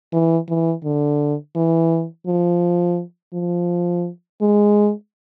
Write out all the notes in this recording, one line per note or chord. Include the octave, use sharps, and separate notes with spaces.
E3
E3
D3
E3
F3
F3
G#3